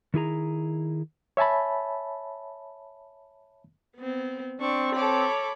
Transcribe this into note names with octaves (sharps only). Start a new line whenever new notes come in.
D#3 E4 G#4 A#5
C#5 E5 G#5 A5 B5
B3 C4
C4 D4 C#6
A4 C#5 B5 D6